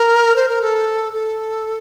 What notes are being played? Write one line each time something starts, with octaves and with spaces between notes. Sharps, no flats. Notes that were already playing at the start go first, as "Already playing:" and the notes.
Already playing: A#4
C5
A#4
A4
A4